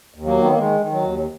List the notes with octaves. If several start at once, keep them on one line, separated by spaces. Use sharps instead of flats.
D#2
F#3 A#3
D#3
B3
A#3
D#3 G#3
D#3
F#3
D#2